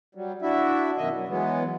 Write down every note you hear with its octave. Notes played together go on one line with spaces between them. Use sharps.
F#3 G3
D4 E4 F#4 E5
F#2 B2 D#3 D#5 E5
F#3
E3 F#3 G#3 B3